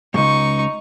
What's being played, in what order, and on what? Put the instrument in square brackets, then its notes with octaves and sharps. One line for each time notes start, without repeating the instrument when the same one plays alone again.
[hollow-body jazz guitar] C#2 G2 [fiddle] D#4 C#6